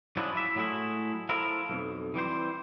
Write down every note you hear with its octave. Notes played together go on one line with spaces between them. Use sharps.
F3 F#3 G#3 C#4 D4 E4
E4 E5
A2 F#3 G#3 A3 E4
F3 E4 A4 A#4
B1 F2
E3 G3 C4 C5